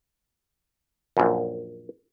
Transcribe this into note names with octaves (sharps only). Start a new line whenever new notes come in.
A#1 F#2